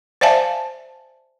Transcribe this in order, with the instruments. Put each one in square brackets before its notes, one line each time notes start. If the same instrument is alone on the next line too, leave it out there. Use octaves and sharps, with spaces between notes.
[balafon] C5 D5 E5 F5 G#5 A5